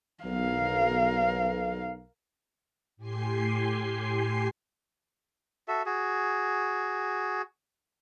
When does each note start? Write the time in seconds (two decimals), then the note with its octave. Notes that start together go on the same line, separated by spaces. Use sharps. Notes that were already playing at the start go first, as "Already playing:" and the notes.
0.24 B1 A#4 F5
2.97 A2 G4 G#5 C6 C7
5.68 F#4 A4 E5
5.86 F#4 G#4